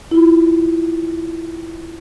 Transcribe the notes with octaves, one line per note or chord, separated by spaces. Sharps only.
E4 F4